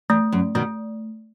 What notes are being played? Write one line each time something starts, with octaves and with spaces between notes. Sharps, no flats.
E2 A3
F#2
B2 D#3 A3